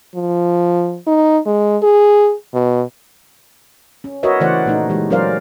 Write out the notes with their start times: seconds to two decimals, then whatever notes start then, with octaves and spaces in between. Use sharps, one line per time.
0.15 F3
1.07 D#4
1.46 G#3
1.83 G#4
2.54 B2
4.04 C#4
4.23 F#4 A#4 B4 C#5 D#5 E5
4.40 C#3 E3 A3 C5 D5 F#5
4.66 A#2 A3 D#4
4.90 E3 G#3 G4
5.10 F#3 C#4 A#4 C5 D5 F5